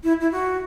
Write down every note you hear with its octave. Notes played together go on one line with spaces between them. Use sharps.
E4
E4
F#4